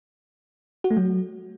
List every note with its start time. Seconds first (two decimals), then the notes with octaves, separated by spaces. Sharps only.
0.84 F#4
0.90 A3
0.97 F#3